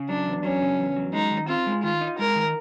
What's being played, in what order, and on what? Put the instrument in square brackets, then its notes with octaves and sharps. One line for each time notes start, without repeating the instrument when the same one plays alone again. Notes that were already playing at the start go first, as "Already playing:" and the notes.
Already playing: [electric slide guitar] C#3
[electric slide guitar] F#3 [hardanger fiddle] D4
[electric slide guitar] E2
[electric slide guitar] F#3 [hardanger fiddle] C#4
[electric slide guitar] C#3
E2
F#3
[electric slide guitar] G#3 [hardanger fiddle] D#4
[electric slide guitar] D#3
[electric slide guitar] C4 [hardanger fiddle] F4
[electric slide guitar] G#3
[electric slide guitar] D#3 [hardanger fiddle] F4
[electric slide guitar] D#4
[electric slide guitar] G#3 [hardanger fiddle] A#4
[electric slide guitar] D#3